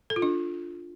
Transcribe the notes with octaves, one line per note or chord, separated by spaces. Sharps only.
A4
F4
D4